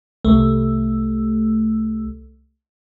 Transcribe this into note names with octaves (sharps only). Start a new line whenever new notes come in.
C2 A3